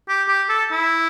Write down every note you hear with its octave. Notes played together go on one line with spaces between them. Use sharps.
G4
G4
A4
E4